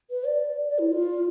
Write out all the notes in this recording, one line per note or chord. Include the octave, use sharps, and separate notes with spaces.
B4
D5
D5
E4
F4